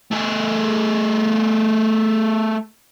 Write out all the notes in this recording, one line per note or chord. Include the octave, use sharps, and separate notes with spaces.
A3 G#4